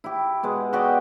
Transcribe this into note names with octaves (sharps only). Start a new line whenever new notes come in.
E4 G4
B2 G#3
F#4 G4 D5 D#5